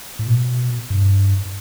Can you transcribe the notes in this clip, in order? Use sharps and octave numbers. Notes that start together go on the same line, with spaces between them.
A2
B2
G2